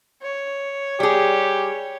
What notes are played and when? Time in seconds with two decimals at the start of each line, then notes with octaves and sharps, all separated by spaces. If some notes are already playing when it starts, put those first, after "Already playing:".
0.22 C#5
1.00 G3 G4 G#4